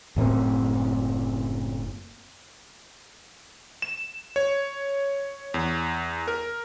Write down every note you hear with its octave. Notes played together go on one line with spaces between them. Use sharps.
F#1 A2 A#3 C4
E7
C#5
E2
A#4